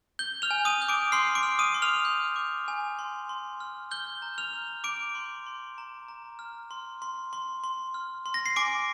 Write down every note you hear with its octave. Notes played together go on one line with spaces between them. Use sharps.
G6 G7
F6 F7
G#5
D#6 D#7
G6
D6 D7
C6 F6 C7
D6 D7
F6
D#6 D#7
C6
F6 F7
G6
D6
G#5
C6
C6
F6
F6 G6 G7
A#5
F6 F7
F6
D6 G6 D7
C6
C6
A#5
A#5
F6
C6
C6
C6
C6
F6
C6
A#6
C7
G#5 D6 D7